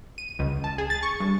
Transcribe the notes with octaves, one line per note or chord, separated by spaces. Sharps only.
D#7
C#2
A5
G#4
A6
C#6
G2